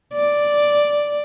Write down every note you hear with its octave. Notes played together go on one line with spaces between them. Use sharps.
D5